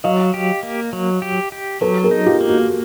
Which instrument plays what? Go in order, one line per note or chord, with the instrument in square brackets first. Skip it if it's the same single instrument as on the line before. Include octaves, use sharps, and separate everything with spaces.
[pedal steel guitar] F#3 [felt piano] D#5 F5
[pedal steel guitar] G4
A#3
F#3
G4
G4
[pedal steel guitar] F#3 [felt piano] A4 B4
[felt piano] G#4 A#4
[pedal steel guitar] D#4
[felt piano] F4 G4
[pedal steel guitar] A#3
[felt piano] F#4